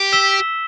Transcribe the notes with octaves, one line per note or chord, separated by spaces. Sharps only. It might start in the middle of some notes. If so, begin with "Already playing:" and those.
Already playing: G4
E6 B6 E7 G7